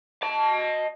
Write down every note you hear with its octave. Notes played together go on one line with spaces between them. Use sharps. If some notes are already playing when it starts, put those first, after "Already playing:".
D#5 A5